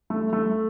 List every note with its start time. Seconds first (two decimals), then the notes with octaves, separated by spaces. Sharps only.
0.10 A3
0.33 A3